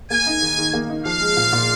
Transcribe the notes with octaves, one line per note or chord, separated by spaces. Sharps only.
A#3 G#5
D#4
D#3
D#3
A#3
D#4
F3 F5
G#3
A#2
A#2